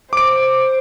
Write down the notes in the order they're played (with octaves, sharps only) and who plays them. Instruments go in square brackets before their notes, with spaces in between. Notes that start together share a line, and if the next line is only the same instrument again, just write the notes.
[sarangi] C5 [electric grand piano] D6 D7